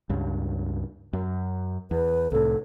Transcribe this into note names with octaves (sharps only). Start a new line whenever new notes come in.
C#2 G2
F#2
E2 B4
C2 A2 A4